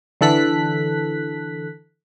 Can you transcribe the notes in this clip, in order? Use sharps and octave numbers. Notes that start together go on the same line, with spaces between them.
D3 E3 A4 F#6 B6